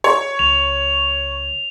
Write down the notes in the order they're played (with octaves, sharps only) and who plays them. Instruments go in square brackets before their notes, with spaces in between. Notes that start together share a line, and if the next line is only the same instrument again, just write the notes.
[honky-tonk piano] C#5
[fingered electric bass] C#2 [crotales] F7